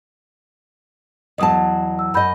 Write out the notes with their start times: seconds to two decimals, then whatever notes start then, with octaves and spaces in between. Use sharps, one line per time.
1.38 E2 F#3 D#5 A5 D#6
1.99 E6
2.14 F#2 D#5 F#5 B5 G6